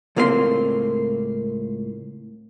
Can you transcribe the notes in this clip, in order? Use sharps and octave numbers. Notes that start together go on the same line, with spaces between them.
C#2 A2 A#3 C4 A4 C6